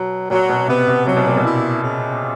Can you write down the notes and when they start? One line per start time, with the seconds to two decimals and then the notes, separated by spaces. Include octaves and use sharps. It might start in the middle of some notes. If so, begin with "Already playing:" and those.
Already playing: B2 F#3
0.30 A#2 F#3
0.49 B2
0.68 C3 B3
0.88 C3
1.06 C3 F#3
1.17 B2
1.27 A#2
1.37 B2
1.45 E4
1.83 C#3